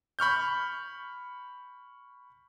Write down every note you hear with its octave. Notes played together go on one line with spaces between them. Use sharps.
B5 C#6 F6 G6